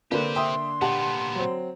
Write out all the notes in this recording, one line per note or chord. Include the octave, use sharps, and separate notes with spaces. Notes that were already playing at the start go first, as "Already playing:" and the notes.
D3 A#3 D4 G4 B4 C5
E5 G5 C6 D#6
A#2 B3 G4 F#5 A5
F#3 C4